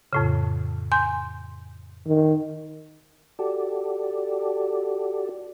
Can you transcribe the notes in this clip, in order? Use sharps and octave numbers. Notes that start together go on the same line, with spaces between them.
F2 A2 C#3
G#5 C6 G6
D#3
F#4 G4 A4 D5